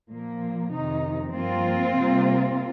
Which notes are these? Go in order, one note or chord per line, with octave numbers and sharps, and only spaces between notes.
A#2 F3 A#3
F2 C3 D#3 D#4
G2 F3 A#3 C4 F4
C3 G3 A#3